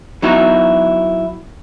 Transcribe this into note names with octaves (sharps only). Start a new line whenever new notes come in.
F#3 B3 D#4 E4 F#4